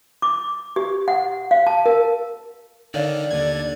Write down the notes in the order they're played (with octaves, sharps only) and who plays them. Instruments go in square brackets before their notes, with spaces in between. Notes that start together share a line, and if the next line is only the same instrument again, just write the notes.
[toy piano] D6
G4
F#5
F5
A5
A#4
[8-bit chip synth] D3 D#3 [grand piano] C#5 F5 [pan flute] D5
[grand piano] D#2 [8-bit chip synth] D3 G#6